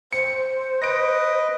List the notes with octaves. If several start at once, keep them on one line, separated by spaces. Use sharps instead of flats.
C5 C#7
B4 D#5 A#6 D7